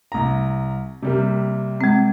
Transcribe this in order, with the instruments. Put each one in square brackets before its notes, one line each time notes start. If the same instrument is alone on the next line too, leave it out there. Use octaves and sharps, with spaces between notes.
[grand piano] C2 A#5
C3 G3 A#3
[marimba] G#3 C4